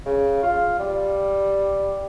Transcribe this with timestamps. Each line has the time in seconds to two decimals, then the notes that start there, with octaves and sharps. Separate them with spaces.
0.06 C#3
0.43 F4
0.79 G3